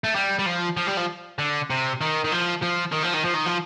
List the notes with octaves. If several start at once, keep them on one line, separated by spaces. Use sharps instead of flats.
A3
G3
G3
F3
F3
G3
F3
D3
C3
D#3
D#3
F3
F3
D#3
F3
D#3
F3
D#3
F3